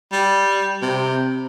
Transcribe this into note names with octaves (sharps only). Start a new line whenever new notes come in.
G3
C3